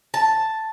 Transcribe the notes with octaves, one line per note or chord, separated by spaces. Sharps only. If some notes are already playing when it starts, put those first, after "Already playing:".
A5